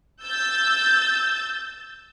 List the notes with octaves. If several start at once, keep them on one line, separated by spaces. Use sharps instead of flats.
E6 G6 A6